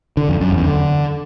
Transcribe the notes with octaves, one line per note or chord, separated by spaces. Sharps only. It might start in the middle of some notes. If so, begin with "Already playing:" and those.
D3
F2
F#2
E2
D3